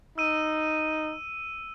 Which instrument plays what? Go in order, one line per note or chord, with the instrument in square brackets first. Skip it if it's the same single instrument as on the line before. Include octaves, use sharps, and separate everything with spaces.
[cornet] D#4 [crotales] E6 D#7